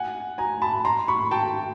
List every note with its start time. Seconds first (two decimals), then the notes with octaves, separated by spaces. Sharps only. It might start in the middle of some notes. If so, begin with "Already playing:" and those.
Already playing: F#5 G#5
0.38 G#5 A#5
0.62 A5 B5
0.85 A#5 C6
1.08 B5 C#6
1.31 G5 A5